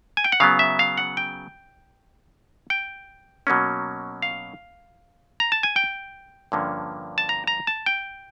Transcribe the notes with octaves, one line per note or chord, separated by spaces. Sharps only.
G#5
G5
F#5
C#3 F#3 B3 F5
E5
F5
F#5
G5
G5
B2 F#3 A#3 C#4
F5
A#5
A5
G#5
G5
G2 D3 F3 A#3 C#4
A5
A#5
A#5
A5
G5